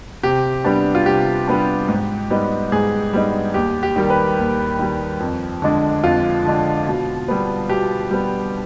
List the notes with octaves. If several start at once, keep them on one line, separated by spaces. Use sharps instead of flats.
C3 G4
G3 B3 D4
F4
C3 G4
G3 B3 D4
G#2
G3 B3 D#4
G#2 G#4
G3 B3 D#4
D#2 G4
G4
D#3 G3
B4
D#2
D#3 G3
F2
D3 G#3 D4
F2 F4
D3 G#3 D4
B2
G3 B3
B2 G4
G3 B3